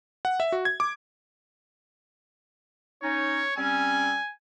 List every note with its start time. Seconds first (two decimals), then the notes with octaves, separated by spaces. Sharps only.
0.25 F#5
0.40 E5
0.52 F#4
0.65 G#6
0.80 D6
3.02 C#4 D#4 C#5
3.57 G3 C4 C#4 G#5